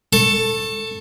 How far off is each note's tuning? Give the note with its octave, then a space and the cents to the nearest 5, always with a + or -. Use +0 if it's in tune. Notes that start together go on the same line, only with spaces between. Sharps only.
A4 +10 C#6 -25